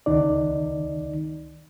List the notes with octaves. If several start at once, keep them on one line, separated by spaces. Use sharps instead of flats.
C#2 D#3 D#4 D5